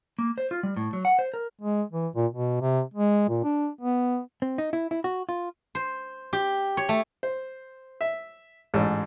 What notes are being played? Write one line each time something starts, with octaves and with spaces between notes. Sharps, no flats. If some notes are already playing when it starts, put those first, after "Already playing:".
A#3
C5
F4
G3
A2
F#3
F#5
C5
A#4
G#3
E3
A#2
B2
C3
G#3
A#2
D4
B3
C4
D#4
E4
E4
F#4
F4
C5
G4
C#5
A3
C5
E5
A1 G#2